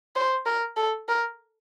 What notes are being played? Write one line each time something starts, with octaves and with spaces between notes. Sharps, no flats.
C5
A#4
A4
A#4